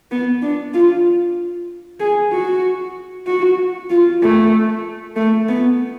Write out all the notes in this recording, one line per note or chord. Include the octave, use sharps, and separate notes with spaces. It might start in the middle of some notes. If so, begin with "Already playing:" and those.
B3
D4
F4
G#4
F#4
F#4
F4
A3
A3
B3